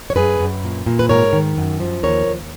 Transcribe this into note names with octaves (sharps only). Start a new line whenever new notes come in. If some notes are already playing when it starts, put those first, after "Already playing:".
C#5
F#2 G#4 B4
F#2
A#2
A#2
B4
G#2 A#4 C#5
D#3
F#2
F3
D#2 A#4 C#5
D#2